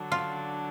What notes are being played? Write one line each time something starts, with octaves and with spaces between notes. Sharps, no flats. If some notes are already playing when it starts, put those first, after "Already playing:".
Already playing: D3 F#3 D4
F4